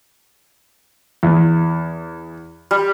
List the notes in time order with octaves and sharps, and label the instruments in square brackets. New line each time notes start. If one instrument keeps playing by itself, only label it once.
[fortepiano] E2
[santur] G3